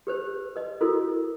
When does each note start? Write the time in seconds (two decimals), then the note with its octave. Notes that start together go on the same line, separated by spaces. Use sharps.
0.07 G4 B4 C5
0.56 B4 D#5
0.81 E4 F#4 A4 A#4